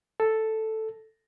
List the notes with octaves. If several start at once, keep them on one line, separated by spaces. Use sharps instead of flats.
A4